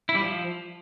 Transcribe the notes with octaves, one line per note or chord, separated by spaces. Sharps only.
E4
G3
F3